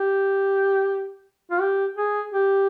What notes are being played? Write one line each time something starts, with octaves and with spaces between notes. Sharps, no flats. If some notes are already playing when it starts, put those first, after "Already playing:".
Already playing: G4
F4
G4
G#4
G4